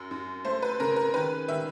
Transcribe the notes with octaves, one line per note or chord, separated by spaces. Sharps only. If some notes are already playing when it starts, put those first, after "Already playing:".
Already playing: F#2
F#2
A3 C5
B4
C#3 A#4
A#4
D#3 B4
D#3 E5